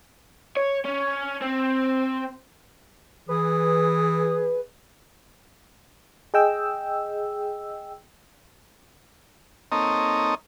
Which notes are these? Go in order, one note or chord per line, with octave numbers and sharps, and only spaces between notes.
C#5
C#4
C4
E3 G#4 B4 D#6
G#4 D#5 G5 E6
A#3 C4 D#4 A4 C#5 D#5